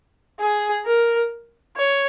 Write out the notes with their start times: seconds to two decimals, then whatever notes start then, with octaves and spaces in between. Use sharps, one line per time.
0.40 G#4
0.86 A#4
1.77 C#5